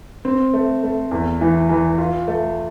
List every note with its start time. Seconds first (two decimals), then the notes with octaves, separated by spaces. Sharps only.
0.25 C4
0.54 A3
0.83 A3
1.11 E2
1.41 E3
1.69 E3
1.98 F4
2.28 A3